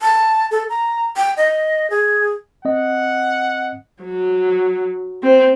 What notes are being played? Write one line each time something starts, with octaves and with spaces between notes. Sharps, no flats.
A5
A4
A#5
G5
D#5
G#4
C4 D#5 F#5
F#3
C4